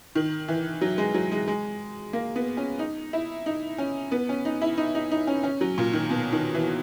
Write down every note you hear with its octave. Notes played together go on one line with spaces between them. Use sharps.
D#3
E3
F#3
G#3
F#3
G#3
G#3
A#3
B3
C#4
D#4
E4
D#4
C#4
B3
C#4
D#4
E4
D#4
D#4
D#4
C#4
C#4
F#3
A#2
D#3
B2
D#3
E3